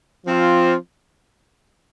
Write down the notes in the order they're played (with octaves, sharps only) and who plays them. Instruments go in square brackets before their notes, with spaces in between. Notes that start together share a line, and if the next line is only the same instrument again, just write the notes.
[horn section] F3 C4 F4